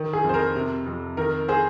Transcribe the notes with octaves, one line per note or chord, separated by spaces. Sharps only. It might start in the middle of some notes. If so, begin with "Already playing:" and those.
Already playing: D#3
G#4
F2
C5
A#4
C3
F2
D#3 A#4
G#4 C5